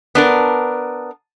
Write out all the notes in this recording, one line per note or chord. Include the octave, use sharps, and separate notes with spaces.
B3 D4 A#4